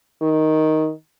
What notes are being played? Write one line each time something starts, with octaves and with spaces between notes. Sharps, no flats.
D#3